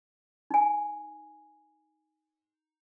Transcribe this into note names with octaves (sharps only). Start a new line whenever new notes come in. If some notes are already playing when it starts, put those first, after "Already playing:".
D#4 G#5